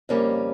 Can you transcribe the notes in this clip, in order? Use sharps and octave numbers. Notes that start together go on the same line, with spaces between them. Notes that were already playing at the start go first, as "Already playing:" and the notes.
F2 C#3 G3 A#3 C#4